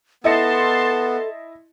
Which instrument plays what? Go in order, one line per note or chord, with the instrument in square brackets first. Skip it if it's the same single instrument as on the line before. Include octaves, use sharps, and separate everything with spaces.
[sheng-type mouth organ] B3 [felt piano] E4 D#5 C#7 [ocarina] A4 [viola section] A5 C6